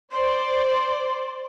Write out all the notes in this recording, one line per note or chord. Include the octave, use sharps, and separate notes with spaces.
C5 D5 C6